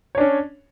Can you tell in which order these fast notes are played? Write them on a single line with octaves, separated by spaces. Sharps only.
C#5 D4 C#4